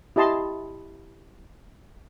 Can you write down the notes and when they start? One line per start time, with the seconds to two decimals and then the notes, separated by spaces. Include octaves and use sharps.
0.16 E4 G4 D#5 A5 C6